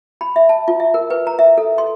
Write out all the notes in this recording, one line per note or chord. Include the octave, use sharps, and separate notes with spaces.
B5
E5
A5
F4
E5
A#4
B4
A#5
E5
A4
C6